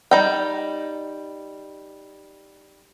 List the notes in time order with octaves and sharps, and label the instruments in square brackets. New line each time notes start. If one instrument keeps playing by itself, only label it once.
[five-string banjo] G3 D#4 G5